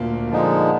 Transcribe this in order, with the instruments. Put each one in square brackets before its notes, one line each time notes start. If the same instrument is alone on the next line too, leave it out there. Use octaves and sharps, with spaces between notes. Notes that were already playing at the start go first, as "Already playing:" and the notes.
Already playing: [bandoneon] D2 [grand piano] A#2 A#3
[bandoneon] D3 F3 G#3 D#4